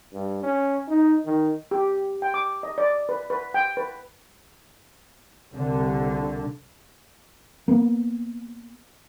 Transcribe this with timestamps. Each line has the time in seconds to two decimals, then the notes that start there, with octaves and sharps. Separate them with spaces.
0.13 G2
0.43 C#4
0.88 D#4
1.25 D#3
1.71 G4
2.22 G5
2.34 D6
2.63 D#5
2.78 D5
3.09 B4
3.30 B4
3.54 G5
3.77 B4
5.54 C2 D3
7.68 A#3 B3